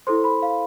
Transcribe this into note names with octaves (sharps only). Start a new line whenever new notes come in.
E4 A4 C5 C6
B5
F5